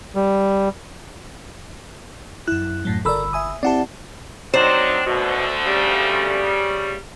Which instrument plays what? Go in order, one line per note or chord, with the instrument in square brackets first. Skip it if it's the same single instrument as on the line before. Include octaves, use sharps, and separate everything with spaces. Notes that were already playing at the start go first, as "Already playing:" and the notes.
[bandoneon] G3
[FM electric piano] F#2 E4 [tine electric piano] F#6
[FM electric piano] F#2 A2 F#3
[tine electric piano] G1 B5 E6 [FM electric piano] A4 A#4 D5
[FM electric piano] E5 G#5 D#6
[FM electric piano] C4 E4 G4 [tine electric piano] D5 F#5 A5
[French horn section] F#3 D#4 [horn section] C4 D4 [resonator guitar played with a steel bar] C5
[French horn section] D2 D3 A3 [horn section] B2
[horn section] C#3 G3